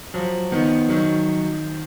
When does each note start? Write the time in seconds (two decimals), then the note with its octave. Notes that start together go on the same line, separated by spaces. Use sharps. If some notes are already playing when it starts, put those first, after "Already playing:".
0.14 F3 F#3
0.52 D#3 B3
0.89 D#3 F#3